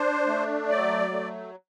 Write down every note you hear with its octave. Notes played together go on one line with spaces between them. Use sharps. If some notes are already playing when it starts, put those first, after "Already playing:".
Already playing: D4 C5
A3
F#3 D5
A3